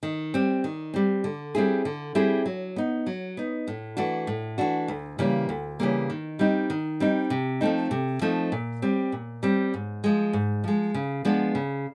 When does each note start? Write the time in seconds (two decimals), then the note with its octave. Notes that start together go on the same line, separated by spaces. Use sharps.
0.03 D#3
0.34 G3 C4
0.64 D#3
0.94 G3 C4
1.24 D3
1.55 G3 C4 E4 G#4
1.85 D3
2.15 G3 C4 E4 G#4
2.46 F#3
2.76 B3 D#4
3.06 F#3
3.37 B3 D#4
3.68 A2
3.97 E3 A3 D4 F#4
4.27 A2
4.58 E3 A3 D4 F#4
4.88 D2
5.19 C#3 E3 G3 A#3
5.49 D2
5.80 C#3 E3 G3 A#3
6.10 D#3
6.39 G3 C4 D#4
6.70 D#3
7.00 G3 C4 D#4
7.30 C3
7.61 F3 A3 C4 D#4
7.91 C3
8.21 F3 A3 C4 D#4
8.52 A#2
8.82 G3 C4
9.12 A#2
9.43 G3 C4
9.74 G#2
10.04 F3 G#3
10.33 G#2
10.64 F3 G#3
10.94 C#3
11.25 F3 G#3 B3 D4
11.55 C#3